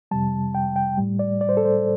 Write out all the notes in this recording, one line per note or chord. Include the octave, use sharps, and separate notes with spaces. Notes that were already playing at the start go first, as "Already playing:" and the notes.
F2 C3 G3 A5
G5
G5
A2 G3
D5
D5
C5
A4
C5